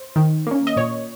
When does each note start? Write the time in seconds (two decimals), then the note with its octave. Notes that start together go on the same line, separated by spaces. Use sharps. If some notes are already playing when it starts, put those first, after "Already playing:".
Already playing: C5
0.16 D#3
0.47 A#3 C#4
0.67 D#5
0.77 A#2 C#5